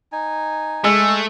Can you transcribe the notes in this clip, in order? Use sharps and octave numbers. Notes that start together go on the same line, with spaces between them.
D#4 G#5
G#3 A3 E6